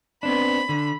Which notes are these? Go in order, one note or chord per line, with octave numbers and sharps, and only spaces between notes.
B3 C4 D4 B5
D3